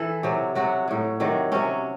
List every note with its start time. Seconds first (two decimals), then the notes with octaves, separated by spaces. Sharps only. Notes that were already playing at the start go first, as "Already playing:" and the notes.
Already playing: E3 A4
0.23 C3 F#3
0.55 C3 F#3 F#4
0.88 A2 F#3
1.20 C3 D#3 F#3
1.52 C3 F#3 C#4